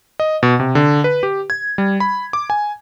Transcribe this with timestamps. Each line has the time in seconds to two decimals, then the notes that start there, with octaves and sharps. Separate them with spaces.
0.20 D#5
0.43 B2
0.60 C3
0.75 D3
1.04 B4
1.23 G4
1.50 G#6
1.78 G3
2.00 B5
2.33 D6
2.50 G#5